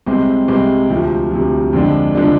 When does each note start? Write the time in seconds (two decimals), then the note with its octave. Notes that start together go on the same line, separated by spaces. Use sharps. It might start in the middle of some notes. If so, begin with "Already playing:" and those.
0.06 C2 C3 G#3 C4
0.48 C2 C3 G#3 C4
0.89 D2 C3 F3
1.31 D2 C3 F3
1.73 F2 D3 F3 G#3 D4
2.15 D3 F3 G#3 D4